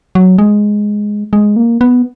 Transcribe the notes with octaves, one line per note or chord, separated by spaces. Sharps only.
F#3
G#3
G#3
A#3
B3